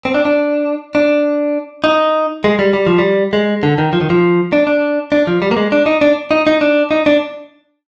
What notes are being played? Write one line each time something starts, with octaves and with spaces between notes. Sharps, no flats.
C4
D4
D4
D4
D#4
G#3
G3
G3
F3
G3
G#3
D3
D#3
F3
D#3
F3
D4
D4
D4
F3
G3
A#3
G#3
D4
D#4
D4
D#4
D#4
D4
D#4
D4